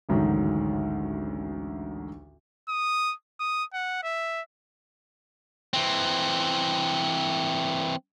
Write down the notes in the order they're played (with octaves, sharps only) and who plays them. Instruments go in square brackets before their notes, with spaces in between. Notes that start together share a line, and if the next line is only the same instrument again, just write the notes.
[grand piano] A1 D2 G#2 D3 D#3 F#3
[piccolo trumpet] D#6
D#6
F#5
E5
[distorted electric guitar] E3 C4